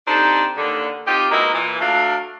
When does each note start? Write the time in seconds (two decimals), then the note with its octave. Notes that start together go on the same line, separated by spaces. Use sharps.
0.08 C4 D4 D#4 G4 A4 C5
0.57 D#2 D3
1.07 C4 D#4 F4 G4
1.31 F#3 G#3 A#3 B3 D#4 E4
1.54 A#2 E3
1.80 F#3 A3 D4 E5 F5